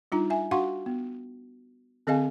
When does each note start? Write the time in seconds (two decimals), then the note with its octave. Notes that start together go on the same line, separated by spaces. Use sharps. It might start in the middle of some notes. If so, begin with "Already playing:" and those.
0.12 G3 D4 D#4 F4 A#5
0.30 E5 G#5
0.51 D4 F#4 F5 F#5 C6 C#6
0.86 B3
2.07 D3 C4 G#4 D#5 F5 G#5